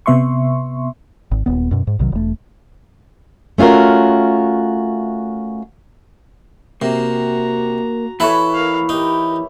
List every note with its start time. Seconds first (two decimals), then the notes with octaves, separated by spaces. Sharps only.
0.06 C3 B3 E5 C6 C#6
1.31 G#1
1.46 D#1 D#2 B3
1.71 F#2 B2
1.87 G#2
1.99 B1 C3 D#3 F#3
2.12 E1 A3
3.58 A3 C#4 F4 F#4 A#4
6.82 C3 A#3 F#4 A#5
8.20 E3 E4 A4 B4 C#5 E5 F#5
8.54 A#4 F5
8.89 D#4 G4 A#4